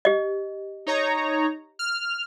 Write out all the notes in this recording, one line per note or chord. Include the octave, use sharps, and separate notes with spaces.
G4 D#5
D#4 C#5 A#5
F6